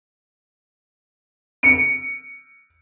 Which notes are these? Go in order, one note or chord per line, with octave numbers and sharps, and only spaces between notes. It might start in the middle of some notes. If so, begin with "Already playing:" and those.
C#7 D7